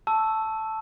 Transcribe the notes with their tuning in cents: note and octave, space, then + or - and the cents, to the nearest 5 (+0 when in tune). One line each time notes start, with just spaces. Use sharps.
A5 +0 C#6 +0 E6 +0